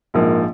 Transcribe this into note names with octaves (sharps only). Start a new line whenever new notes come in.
A#1 G#2 F3 A#3